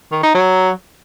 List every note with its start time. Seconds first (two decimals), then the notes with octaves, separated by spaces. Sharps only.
0.12 D#3
0.23 D#4
0.35 F#3